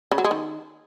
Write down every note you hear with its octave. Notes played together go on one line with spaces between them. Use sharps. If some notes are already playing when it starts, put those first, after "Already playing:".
C#3
F#3
G#3
D#3